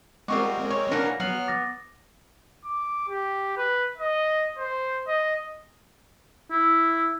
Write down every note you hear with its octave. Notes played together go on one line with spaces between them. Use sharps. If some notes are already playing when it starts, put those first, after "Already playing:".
G3 G#3 C4 F4 F#4 A#4 C#6 D6
C#5
E3 F#3 A#3 C#4 D4 A#4 A#6
F#3 B3 F6 C7 F#7
D6 A6 A#6
D6
G4
B4
D#5
C5
D#5
E4